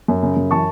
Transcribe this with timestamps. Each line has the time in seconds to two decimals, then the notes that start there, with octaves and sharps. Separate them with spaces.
0.08 F#2
0.23 C#3
0.36 F#2
0.51 E3 A5 C#6